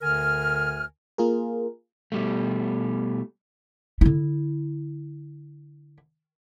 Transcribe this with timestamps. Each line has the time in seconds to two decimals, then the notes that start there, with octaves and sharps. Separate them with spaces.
0.02 D2 D3 A#4 G#5 F6
1.18 A#3 F4 G#4 A#4
2.12 B2 G3 A3
4.01 D3 E4